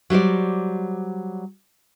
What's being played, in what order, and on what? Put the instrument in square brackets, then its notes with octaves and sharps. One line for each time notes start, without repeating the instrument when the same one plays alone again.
[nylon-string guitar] F#3 G3 C5 D5